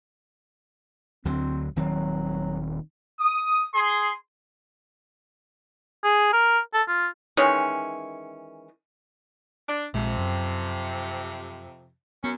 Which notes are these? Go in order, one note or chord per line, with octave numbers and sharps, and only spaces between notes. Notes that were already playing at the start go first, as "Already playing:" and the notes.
D2 D3 F#3 C4
D#1 D#3 F#3 C4
D#6
G#4 C6
G#4
A#4
A4
F4
D#3 E3 G#3 C#4
D4
A#1 F2 C3 G#3
F#2
F#2 B3 C#4